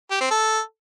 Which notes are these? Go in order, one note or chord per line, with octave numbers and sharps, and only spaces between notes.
G4
C4
A4